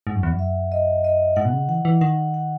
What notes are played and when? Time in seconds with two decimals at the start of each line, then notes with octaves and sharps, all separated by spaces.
0.07 G#2 F#5
0.15 F#2
0.23 E2
0.33 F#2
0.39 E5
0.72 D#5
1.04 D#5
1.36 G#2 F#5
1.45 B2
1.53 C#3
1.69 E3 F#5
1.85 E3
2.01 D#3 F#5
2.34 F#5